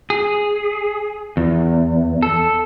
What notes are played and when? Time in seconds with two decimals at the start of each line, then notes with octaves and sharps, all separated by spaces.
0.10 G#4
1.37 E2
2.23 A4